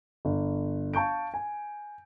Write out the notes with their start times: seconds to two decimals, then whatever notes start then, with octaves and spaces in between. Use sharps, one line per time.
0.25 G1
0.94 F5 A5 C#6 G6 D7
1.34 G#5